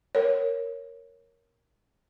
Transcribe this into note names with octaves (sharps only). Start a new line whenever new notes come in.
A#4 C#5